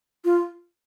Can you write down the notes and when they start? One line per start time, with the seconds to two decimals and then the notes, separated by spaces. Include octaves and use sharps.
0.25 F4